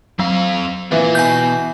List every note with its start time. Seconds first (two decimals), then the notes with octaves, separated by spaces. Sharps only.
0.19 F#3 C4 F5
0.92 E3 A#3 F4
1.15 B2 G#5 G6